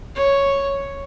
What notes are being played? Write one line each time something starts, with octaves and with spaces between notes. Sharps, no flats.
C#5